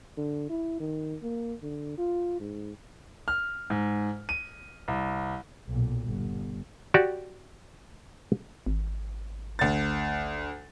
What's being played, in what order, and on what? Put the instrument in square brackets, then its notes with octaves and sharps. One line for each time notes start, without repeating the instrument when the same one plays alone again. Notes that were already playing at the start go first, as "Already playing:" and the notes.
[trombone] D3
E4
D#3
A#3
D3
F4
G#2
[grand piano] F6
G#2
D#7
C2
[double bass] B1 A#2
G1
[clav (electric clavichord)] F#4 G4 D5
[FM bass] G#1
[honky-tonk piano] D2 A6